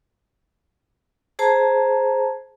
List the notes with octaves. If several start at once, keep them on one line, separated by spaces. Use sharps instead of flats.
G#4 C5 A5 A#5